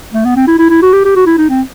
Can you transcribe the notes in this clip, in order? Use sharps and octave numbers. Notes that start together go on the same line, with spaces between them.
A3
B3
C4
E4
E4
E4
F#4
G4
G4
F#4
E4
D#4
C4